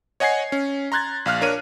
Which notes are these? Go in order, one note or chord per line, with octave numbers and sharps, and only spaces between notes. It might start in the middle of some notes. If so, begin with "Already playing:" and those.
C#5 D#5 F#5 G#5 G#6 C7
C#4
A#5 C6 F#6 G#6 A6
A#1 F5 F6 F#6
D4 A#4 C#5 D#7